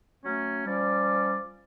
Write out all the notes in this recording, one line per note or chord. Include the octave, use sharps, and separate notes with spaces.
F#3 A3 C#4
F3 G3 C#4 D5